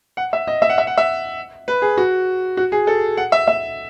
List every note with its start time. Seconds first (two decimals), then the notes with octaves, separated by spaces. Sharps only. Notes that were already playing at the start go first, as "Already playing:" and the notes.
0.17 F#5
0.33 E5
0.47 D#5
0.62 E5
0.70 F#5
0.78 E5
0.87 F#5
0.98 E5
1.68 B4
1.82 G#4
1.97 F#4
2.57 F#4
2.72 G#4
2.87 A4
3.17 F#5
3.32 E5
3.48 E5